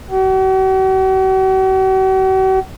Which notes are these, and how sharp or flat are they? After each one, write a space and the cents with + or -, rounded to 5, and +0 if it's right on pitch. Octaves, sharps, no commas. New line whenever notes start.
F#4 +45